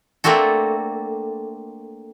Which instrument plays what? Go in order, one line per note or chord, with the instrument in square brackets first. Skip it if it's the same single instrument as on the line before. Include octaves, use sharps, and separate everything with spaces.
[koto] A3 A#3 C4 D4 F#4 A4